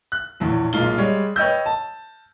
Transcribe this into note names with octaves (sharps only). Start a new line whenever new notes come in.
F#6
A#1 E2 A2
B1 A#2 G#3 F4 G7
G3 G#3 C#5
B4 C#5 D#5 G5 E6 G6
A5